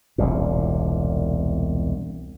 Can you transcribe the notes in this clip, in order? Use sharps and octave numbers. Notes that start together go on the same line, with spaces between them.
E1 C2 A#2